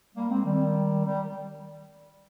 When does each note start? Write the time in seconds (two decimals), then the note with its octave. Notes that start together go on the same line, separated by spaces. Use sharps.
0.14 G3 A#3
0.29 G#3 C4
0.43 D#3 G3
1.04 D#3 G3